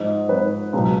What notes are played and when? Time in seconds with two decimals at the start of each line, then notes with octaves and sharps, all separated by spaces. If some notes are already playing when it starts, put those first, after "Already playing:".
Already playing: G#2 F3 D#5
0.28 G#2 F3 B4
0.73 C#2 B2 F#3